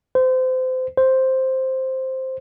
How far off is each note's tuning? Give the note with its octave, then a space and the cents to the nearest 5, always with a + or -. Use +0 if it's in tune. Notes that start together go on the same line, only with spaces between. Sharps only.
C5 -30
C5 +0